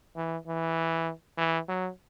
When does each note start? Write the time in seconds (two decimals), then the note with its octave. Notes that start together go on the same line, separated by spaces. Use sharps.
0.16 E3
0.47 E3
1.37 E3
1.68 F#3